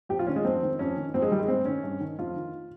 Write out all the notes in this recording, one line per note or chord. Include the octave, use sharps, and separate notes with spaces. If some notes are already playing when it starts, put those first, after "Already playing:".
F2 G4
F4
D#3 C#4
G#3
F2 C4
D#3
F2 C#4
D#3
F2 C4
G#3
D#3 G3
G#3
G2 C4
D#3 C#4
G2
D#3
F2 F4
D#3